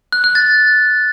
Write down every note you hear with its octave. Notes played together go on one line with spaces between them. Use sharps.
F#6
F#6
A6